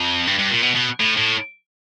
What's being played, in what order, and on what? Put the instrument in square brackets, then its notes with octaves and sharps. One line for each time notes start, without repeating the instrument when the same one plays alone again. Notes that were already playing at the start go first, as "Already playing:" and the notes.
Already playing: [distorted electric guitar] F2
G2
G2
A#2
B2
B2
A2
A2